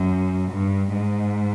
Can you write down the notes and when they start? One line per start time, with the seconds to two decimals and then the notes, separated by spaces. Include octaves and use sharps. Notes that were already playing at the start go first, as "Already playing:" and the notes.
Already playing: F#2
0.51 G2
0.92 G#2